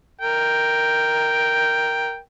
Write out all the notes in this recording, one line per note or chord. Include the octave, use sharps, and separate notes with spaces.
A#4 G5